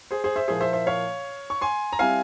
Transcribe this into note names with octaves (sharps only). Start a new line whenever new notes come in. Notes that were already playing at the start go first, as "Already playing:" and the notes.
G#4 C5
G#4 C5
C5 E5
A#2 F3 A#3 E4 G#4 C5
C5 E5
C5 E5
C#5 F5
C#6
G#5 C6
A#5
G3 C4 E4 F5 G#5